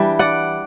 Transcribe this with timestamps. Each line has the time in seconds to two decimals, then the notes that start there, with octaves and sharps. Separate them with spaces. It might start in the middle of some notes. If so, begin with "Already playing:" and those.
Already playing: E3 G3 D4
0.19 D5 F#5